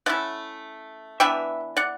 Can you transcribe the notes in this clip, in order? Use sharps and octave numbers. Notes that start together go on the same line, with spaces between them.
D3 A3 C#4 E4 D5 F#5
E3 B3 D4 E5 G5
D5 F#5